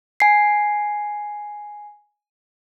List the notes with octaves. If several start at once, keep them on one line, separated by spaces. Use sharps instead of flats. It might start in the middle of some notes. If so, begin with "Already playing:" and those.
G#5 C7